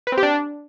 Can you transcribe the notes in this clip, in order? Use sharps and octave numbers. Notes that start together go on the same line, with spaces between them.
B4
C4
G4
D4